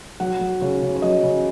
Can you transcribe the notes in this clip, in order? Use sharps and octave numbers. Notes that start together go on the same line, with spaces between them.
F#3 F#5
F#3
C#3 C#5
C#3
C#5
F#3 D#5
C#3